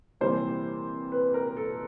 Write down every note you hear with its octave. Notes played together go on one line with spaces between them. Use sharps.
C3 E3 G3 A#3 C5
B4
A#4
A4